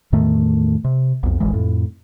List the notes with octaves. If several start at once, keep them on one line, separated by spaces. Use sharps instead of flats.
E2 A2 D#3 A3
C3
B1 F2
D1 G#1 E3 G#3
F2 A2